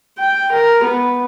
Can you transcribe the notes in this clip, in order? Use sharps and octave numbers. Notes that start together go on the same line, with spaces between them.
G5
A#4
B3